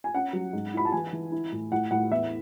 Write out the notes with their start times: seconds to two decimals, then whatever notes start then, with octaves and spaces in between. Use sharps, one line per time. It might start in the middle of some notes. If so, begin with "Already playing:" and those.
0.04 G#5
0.14 C#4 F#5
0.33 F#3
0.53 G#2
0.74 E4 B5
0.85 A5
0.92 E3 G#5
1.13 E3
1.32 E4
1.52 A2
1.72 A2 F#5
1.91 A2 F#5
2.11 E2 E5